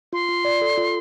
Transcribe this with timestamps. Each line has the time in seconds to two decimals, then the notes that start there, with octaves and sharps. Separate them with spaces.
0.13 F4 C6
0.29 F4
0.45 D5
0.61 A4
0.78 F4